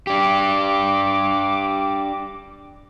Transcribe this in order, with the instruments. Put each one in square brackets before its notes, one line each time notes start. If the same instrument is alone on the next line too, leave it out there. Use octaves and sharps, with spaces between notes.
[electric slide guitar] D4 G4 [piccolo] D6